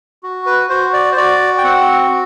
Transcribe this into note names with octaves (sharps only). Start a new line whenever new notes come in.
F#4
B4
F#4 C5
D5
C5
F#4 D5
G5
C4 F#5